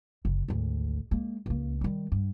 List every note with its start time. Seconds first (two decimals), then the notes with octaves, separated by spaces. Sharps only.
0.25 F#1 C#3
0.48 G#1 D2
1.11 G#3 A#3
1.46 C#2 A#3
1.81 D#3 G3
2.12 G2